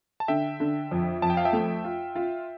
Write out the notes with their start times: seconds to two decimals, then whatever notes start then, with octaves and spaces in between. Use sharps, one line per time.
0.20 A5
0.28 D3 E5 G5
0.60 D3
0.91 F2
1.22 F2 A5
1.30 G5
1.37 F5
1.45 E5 G5
1.53 A3
1.84 F4
2.15 F4